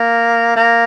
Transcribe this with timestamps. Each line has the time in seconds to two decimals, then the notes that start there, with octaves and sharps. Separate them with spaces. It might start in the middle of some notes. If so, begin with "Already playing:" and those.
Already playing: A#3
0.56 A#3